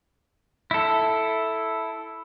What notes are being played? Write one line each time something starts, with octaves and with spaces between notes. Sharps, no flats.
E4 A4